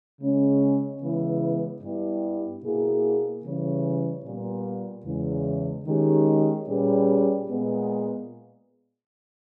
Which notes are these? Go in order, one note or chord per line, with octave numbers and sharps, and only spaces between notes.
C#3 G#3 C#4
C#3 E3 G#3 B3 E4
G2 G3 B3 E4 G4
B2 A#3 E4 G#4
C#3 E3 G3 C#4
A#2 G3 B3
E2 C#3 E3 G#3
D#3 G#3 C#4 G4
A#2 G3 C#4 G#4 B4
A#2 G#3 B3